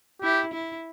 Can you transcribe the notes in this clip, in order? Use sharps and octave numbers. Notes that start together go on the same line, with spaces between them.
E4 G4
E4